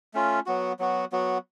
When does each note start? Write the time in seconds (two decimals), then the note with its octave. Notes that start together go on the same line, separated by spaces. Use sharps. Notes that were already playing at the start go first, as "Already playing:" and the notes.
0.14 A3 C#4 F4
0.46 F#3 B3 F#4
0.79 F#3 B3 F#4
1.12 F#3 B3 F#4